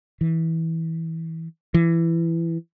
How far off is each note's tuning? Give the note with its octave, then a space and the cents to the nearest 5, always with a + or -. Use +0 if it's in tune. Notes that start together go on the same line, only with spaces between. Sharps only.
E3 -20
E3 +15